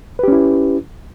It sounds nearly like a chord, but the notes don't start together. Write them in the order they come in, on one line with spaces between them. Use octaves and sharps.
B4 G4 C#4 E4